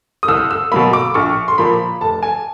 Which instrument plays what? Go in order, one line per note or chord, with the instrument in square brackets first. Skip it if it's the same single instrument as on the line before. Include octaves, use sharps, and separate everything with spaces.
[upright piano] D#6
C2 E6
E6
B2 F#3 A#3 B5
D6
A#1 C#6
C6
A#2 F3 A#3 B5
F1 A5
G#5